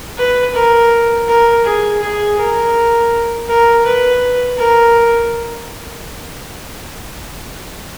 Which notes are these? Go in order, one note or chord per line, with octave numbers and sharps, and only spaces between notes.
B4
A#4
A#4
G#4
G#4
A#4
A#4
B4
A#4